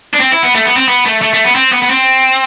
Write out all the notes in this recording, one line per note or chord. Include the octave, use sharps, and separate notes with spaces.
D4
C4
E4
B3
A3
B3
C4
B3
A3
A3
A3
B3
C4
B3
B3
C4